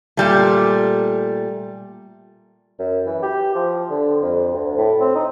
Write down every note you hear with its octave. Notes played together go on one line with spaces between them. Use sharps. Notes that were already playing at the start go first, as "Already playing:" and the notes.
A#2 G3 A3
F#2
E3
G4
F3
D3
F2
D2
A2
C4
D#4